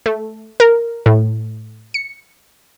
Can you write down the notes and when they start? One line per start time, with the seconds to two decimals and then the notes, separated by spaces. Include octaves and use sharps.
0.06 A3
0.60 A#4
1.06 A2
1.94 C#7